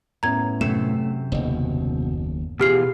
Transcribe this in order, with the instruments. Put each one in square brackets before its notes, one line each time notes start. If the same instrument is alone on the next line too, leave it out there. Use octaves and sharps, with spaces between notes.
[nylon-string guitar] A2 B3 C#4 [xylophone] A#5 G#6
[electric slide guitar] F#2 C3 [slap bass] A3 [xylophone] E7
[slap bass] F#1 D#2 [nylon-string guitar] B2
[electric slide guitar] B2 E3 F4 [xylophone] G4 F6 C7 [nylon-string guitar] G#4